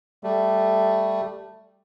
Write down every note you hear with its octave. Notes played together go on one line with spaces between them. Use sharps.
G3 A3